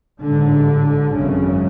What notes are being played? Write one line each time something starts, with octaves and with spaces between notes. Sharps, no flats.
A1 G#2 D3
G#1 F#2 C#3